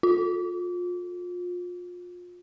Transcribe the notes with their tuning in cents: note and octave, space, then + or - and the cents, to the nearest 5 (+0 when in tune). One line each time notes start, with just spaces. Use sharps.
F4 +30